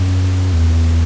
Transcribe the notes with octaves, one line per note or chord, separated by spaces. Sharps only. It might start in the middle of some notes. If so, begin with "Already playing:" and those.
Already playing: F#2
E2